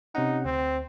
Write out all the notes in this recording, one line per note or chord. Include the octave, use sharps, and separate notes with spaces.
C3 C#4 D#4 F#5
D2 C4